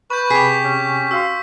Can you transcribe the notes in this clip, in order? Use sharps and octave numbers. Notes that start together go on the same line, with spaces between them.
B4 B5 C#6 G6
C3 G4 G#4 B6
C#4
F#4 F5 C6 E6